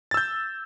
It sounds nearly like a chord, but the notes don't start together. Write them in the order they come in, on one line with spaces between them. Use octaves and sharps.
A6 E6 G6